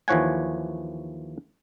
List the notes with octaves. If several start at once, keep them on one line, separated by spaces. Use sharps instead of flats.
D#2 E3 F3 C#5 F#5 G#5